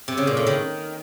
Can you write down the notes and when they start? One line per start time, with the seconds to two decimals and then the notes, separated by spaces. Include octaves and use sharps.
0.08 C3
0.18 C#3
0.27 A#2
0.37 A2
0.47 D#3